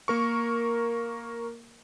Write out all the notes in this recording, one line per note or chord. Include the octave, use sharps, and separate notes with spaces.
A#3 A#4 C#6